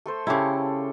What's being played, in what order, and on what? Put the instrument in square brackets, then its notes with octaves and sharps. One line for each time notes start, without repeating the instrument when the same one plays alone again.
[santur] A3 A4 C5
[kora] C#3 E4 [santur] G4 A4 F5